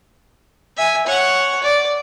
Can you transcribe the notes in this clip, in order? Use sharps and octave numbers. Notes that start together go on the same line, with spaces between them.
E5 G#5
C#5 F#5
D5